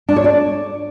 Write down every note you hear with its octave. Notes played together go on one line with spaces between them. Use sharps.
D4
C#5
D5